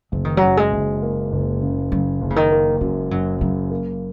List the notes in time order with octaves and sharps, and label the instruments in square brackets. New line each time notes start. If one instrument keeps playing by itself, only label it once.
[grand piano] F#1 [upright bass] F#3
[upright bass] D#3
[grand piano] F#2 [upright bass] F#3
[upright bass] G#3
[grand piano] F#1
A#3
F#1
C#3
[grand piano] C#3 [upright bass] F#3
[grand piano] F#1
[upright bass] C#3
D#3
[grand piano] A#3
[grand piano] F#2 [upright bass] G#3
[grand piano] F#2 [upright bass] F#3
[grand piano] C#3 [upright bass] F#3
[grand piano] A#3